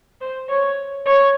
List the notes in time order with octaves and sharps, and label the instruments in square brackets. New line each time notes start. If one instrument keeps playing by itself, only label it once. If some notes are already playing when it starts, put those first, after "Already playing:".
[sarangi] C5
C#5
C#5